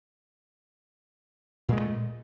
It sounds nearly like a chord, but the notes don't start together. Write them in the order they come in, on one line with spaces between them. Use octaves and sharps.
A#2 G#3 G2 A3